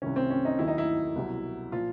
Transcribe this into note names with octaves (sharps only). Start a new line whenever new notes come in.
C2 C3 D#3 C#4
C4
C#4
D#4
D#2 D#3 F#3 E4
D#4
E4
C2 B2 F#3
A#2 F3 F4